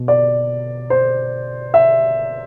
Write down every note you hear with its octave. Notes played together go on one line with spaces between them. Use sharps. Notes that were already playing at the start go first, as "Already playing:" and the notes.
Already playing: B2
D5
C5
E5